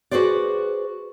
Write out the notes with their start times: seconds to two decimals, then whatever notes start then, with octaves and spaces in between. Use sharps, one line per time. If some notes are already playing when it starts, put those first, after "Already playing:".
0.11 F#4 G#4 B4 C5 D5